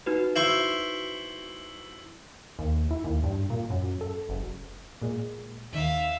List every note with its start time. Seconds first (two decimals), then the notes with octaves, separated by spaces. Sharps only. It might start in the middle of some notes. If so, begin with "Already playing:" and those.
0.06 D#4 F#4 B4
0.36 E4 C5 C#6
2.59 D#2
2.91 E4
3.04 D#2
3.24 G2
3.50 A#2
3.70 F#2
4.01 A4
4.29 F#1
5.02 A#2 G#3
5.72 D#2 D#3 E5 F5